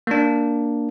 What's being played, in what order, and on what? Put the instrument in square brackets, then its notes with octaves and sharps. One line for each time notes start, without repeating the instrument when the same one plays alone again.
[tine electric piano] A#3 D4